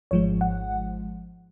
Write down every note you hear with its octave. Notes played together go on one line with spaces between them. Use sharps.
G#1 G#2 F3 G#3 C#5
F#5